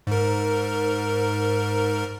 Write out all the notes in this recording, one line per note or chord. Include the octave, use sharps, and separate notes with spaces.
G#2 A#4